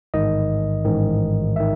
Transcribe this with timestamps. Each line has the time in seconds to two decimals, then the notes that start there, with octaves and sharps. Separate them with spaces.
0.14 A1 G#2 D#3 D#5
0.85 A1 G#2 D#3
1.56 D#3 E5